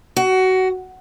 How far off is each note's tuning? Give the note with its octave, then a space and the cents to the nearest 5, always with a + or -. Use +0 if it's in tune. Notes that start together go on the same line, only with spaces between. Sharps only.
F#4 +20